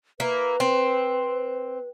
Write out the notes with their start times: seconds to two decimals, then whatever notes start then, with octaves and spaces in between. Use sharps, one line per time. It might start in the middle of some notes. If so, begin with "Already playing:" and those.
0.20 A#3 E4 B4
0.60 C4